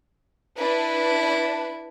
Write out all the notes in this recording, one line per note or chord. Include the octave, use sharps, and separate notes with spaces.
D4 E4 B4